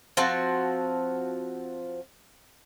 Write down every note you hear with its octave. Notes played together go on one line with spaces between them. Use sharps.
F3 C4 F#4 A5